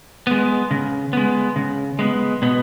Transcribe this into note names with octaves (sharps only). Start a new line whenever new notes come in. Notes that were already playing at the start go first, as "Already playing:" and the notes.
G#3 B3
C#3
G#3 B3
C#3
G#3 B3
B2 B3